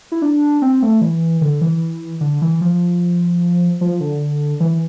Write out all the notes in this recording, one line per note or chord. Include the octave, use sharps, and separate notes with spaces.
E4
D4
C4
A3
E3
D3
E3
D3
E3
F3
F3
D3
E3